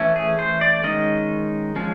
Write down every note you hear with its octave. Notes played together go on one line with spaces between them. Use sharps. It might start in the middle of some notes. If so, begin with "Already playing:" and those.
Already playing: E3 A3 C#4
G#4
C5
D5
D#3 G#3 C#4 D#5
F3 G#3 C#4